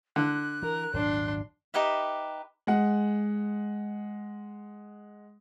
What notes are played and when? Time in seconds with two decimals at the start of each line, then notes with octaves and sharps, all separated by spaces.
0.16 D3 F#6
0.62 E3 A#4
0.94 D#1 G#1 F#3 D4 C6
1.74 D#4 G4 B4 E5
2.67 G#3 F#5